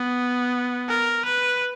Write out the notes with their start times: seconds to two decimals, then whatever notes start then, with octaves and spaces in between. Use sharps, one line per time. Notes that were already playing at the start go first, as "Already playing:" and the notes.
Already playing: B3
0.88 A#4
1.25 B4